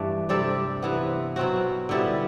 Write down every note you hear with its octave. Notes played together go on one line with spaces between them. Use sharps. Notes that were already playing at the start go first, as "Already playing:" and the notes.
Already playing: G2 E3 A3 D4
C3 G3 D4 A4
C3 E3 B3
B2 F#3 C4 F#4
D3 G3 B3 E4